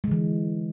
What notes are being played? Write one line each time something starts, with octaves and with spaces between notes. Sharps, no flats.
D3 E3 G#3